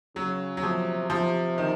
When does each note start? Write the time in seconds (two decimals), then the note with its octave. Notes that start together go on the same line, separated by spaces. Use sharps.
0.16 C#3 F#3
0.57 F#3
0.63 C3 F3
1.10 C3 F3
1.58 D#3